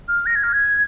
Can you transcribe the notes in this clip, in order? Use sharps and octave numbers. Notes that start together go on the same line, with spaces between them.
F6
A#6
G#6
F6
G#6